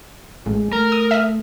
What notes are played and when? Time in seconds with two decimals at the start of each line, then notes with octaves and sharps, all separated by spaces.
0.46 A1 G#3
0.73 A3 A#4
0.92 D#6
1.11 E5 D#6 F6